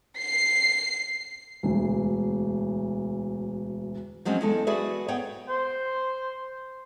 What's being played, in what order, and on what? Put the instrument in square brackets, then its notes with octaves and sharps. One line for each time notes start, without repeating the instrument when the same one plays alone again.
[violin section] C7
[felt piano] E1 D2
[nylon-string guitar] F3 F#3 G#3 C4 C#4
E2 G#3 A4
F#4 G#4 B4 D5 E5
B3 C#5 F#5 G5
[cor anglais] C5